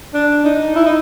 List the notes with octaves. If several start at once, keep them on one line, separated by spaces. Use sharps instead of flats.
D4
D#4
E4
D#4